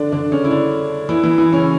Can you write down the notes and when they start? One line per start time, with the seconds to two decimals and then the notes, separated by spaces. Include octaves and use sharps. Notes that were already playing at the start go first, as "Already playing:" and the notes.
Already playing: D3 D4
0.12 D3 D4
0.31 C#3 C#4
0.44 E4
0.51 D3 D4
1.09 E3 E4
1.23 E3 E4
1.38 E3 E4
1.53 C#3 C#4